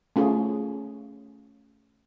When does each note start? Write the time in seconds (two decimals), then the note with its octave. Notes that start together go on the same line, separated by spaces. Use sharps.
0.16 A3 C#4 F4 G#4